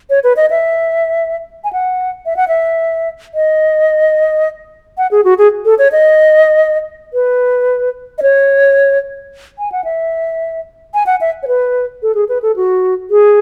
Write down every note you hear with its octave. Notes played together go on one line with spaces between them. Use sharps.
C#5
B4
D#5
E5
G#5
F#5
E5
F#5
E5
D#5
F#5
G#4
F#4
G#4
A4
C#5
D#5
B4
D#5
C#5
G#5
F#5
E5
G#5
F#5
E5
C#5
B4
A4
G#4
B4
A4
F#4
G#4